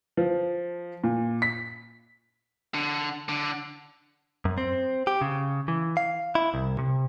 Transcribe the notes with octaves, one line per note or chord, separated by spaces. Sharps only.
F3
A#2
B6
D3
D3
F#2
C4
G4
C#3
E3
F5
E4
C2
C3